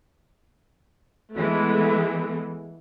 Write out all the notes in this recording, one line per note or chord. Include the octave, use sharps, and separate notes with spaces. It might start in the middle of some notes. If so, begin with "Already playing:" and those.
E3 G#3 A3 B3